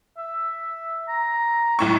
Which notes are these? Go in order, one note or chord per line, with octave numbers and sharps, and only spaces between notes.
E5
A#5
B1 A2 C#6